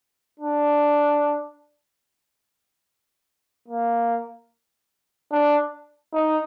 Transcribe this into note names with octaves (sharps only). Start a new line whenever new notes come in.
D4
A#3
D4
D#4